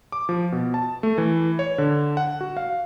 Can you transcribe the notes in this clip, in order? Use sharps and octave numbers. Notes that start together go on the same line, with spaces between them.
D6
F3
B2
A5
A3
E3
C#5
D3
F#5
F#4
F5